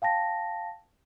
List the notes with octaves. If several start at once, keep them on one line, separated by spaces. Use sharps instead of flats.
F5 G5 A5 A#6